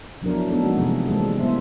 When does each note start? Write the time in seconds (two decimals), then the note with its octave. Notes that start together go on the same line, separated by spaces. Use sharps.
0.22 F3 F#3 B3 D4 E4 A#4
0.47 A3 B3 D4 D#4 A4
0.62 F3 G#3 A#3 C#4 D#4 F#4
0.77 C3 E3 A3 G#4
1.06 E3 G3 G#3 A#3 C4 A4
1.38 G3 A#3 B3 E4 C5 E5